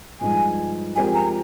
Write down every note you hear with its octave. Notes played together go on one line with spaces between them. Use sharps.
G2 F3 G#3 D#4 G#5
F3 G#3 C4 G4 A#4 G#5
A#5